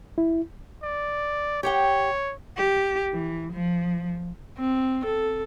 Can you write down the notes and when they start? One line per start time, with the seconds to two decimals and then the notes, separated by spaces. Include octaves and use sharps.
0.18 E4
0.83 D5
1.63 G4 C#5 F#5 G5
2.57 G4
3.13 E3
3.52 F3
4.58 C4
5.05 A4